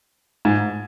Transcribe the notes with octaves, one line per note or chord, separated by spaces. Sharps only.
G#2